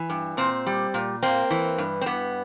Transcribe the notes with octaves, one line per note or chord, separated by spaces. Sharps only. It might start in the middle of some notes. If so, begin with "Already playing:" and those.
Already playing: E3
G2
A#2 C4
G3
A#2
A#3 C4
E3
G2
C4
G2 B3